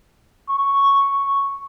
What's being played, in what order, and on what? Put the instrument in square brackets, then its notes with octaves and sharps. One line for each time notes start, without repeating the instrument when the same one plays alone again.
[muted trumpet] C#6